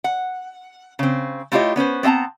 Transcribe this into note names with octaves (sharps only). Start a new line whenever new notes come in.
F#5
C#3 C4
A3 E4 F4 G4 C#5 D#5
B3 C#4 B4 C5
B3 C4 E5 A5 A#5